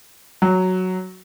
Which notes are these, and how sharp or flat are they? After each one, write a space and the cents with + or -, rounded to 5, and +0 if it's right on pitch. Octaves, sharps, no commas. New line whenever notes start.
F#3 +0